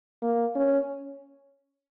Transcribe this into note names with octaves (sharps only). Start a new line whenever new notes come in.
A#3
C#4